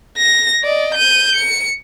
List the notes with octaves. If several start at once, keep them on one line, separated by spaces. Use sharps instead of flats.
A#6
D5 D#5
G6 D#7
C#7